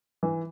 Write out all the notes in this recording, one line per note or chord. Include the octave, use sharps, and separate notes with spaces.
E3